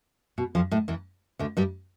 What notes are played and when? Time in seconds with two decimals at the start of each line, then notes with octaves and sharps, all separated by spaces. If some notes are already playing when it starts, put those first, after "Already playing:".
0.38 B2
0.55 F2 F3
0.71 A2 A3
0.88 E2 E3
1.39 D2 D3
1.57 G2 G3